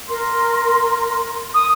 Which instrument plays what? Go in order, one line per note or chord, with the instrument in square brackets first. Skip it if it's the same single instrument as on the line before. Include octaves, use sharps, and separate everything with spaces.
[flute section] A#4 C6
[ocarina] D#6